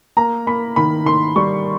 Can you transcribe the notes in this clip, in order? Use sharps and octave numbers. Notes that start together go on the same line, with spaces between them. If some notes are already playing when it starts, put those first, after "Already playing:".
A#3 A#5
A#3 B5
D#3 B5
D#3 C6
G3 C#6